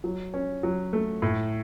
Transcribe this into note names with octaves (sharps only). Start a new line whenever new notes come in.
F#3
C#4
F#3
A3
A2